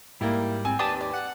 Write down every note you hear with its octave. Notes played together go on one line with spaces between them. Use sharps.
G#2 G3 A#3 E4
C4 G#5
D#2 D4 G4 B4 G5 A5 D#6
D5
F#5